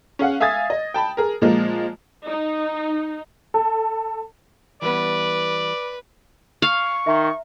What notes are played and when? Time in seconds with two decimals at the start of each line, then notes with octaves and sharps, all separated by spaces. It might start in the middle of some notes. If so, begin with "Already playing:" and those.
0.19 C#4 G#4 F5 F#5
0.40 E5 F5 G#5 D#6 G#6 A6
0.70 D#5
0.94 G5 A5 B5
1.17 G#4 A#4
1.41 A#2 F3 G#3 A#3
2.27 D#4
3.54 A4
4.82 E3 G3 B3 B4 D5
6.62 F5 C#6
7.07 D#3 E5 A#5